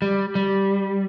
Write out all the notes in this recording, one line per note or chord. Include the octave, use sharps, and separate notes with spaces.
G3
G3